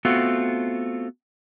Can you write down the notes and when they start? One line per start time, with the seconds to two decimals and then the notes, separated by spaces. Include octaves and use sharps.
0.05 A3 B3 C4 F4 F#4 A4